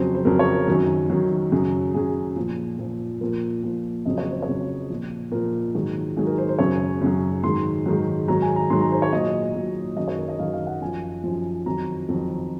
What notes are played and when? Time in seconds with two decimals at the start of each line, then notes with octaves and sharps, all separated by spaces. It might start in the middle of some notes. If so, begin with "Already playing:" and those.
Already playing: F2 C#3 F#3 C5
0.15 C5
0.25 F2 C#3 F#3 A#4
0.39 C#5
0.53 A#4
0.67 F#2 D#3 F#3
1.10 F#2 D#3 F#3
1.52 F#2 C#3 F#3
1.94 F#2 C#3 F#3 G#4
2.36 A#2 F3
2.79 A#2 F3
3.21 A#2 F3 A#4
3.63 A#2 F3
4.05 F2 C#3 F#3 D#5
4.18 C#5
4.30 C5
4.43 C#5
4.48 F2 C#3 F#3
4.90 A#2 F3
5.32 A#2 F3 A#4
5.75 G#2 D#3 F#3
6.17 G#2 D#3 F#3 G#4
6.27 A#4
6.38 C5
6.49 C5
6.59 F#2 C#3 F#3 C#5
7.01 F#2 C#3 F#3
7.44 G#2 D#3 F#3 C6
7.86 G#2 D#3 F#3
8.28 G#2 D#3 F#3 A#5
8.42 G#5
8.56 A#5
8.70 G#2 D#3 F#3 C6
8.81 A#5
8.92 C5
9.02 C#5
9.13 A#2 F#3 D#5
9.55 A#2 F#3
9.97 F#2 D#3 F#3 D#5
10.08 C#5
10.18 A#4
10.29 D#5
10.39 F#2 D#3 F#3 F5
10.53 F5
10.67 F#5
10.81 F#2 F3 G#5
11.24 F#2 F3
11.66 F2 D#3 F#3 A#5
12.08 F2 D#3 F#3